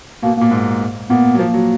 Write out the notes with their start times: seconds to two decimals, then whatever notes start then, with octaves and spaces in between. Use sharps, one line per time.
0.22 B2 A#3
0.37 A#2 A#3
0.51 G#2
1.10 A#2 B3
1.34 F#3
1.39 F3 A#3
1.54 F#3